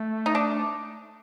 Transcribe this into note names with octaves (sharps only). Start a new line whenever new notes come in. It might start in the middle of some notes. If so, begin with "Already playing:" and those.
Already playing: A3
D#4
D4